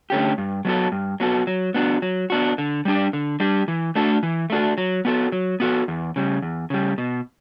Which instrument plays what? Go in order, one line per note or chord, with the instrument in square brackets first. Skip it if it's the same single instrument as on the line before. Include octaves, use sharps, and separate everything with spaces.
[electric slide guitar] D3 A3 C#4 G4
G2
F#3 B3 F#4 A4
G2
F#3 B3 F#4 A4
F#3
B3 D4 F#4
F#3
B3 D4 F#4
D3
G3 D4 G4
D3
G3 D4 G4
E3
A3 D4 F#4 A4
E3
A3 D4 F#4 A4
F#3
B3 F#4 A4
F#3
B3 F#4 A4
E2
C#3 G3
E2
C#3 G3
B2